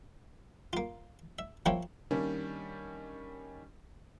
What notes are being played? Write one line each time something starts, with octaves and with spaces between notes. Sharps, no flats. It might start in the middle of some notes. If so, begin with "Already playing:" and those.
A#3 F4
E5
F3 A#3 E4 F4 G4 C#5
D#3 G3 A#3 C#4 D4